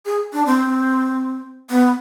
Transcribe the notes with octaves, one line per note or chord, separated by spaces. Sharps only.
G#4
D4
C4
B3